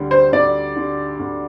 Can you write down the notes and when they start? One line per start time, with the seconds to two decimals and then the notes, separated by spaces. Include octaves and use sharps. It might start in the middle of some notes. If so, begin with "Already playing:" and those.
Already playing: D2 D3 G3
0.11 C5
0.32 D2 D5
0.76 D3 G3
1.19 D2